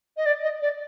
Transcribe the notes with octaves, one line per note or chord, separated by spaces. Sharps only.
D#5
D5
D#5
D5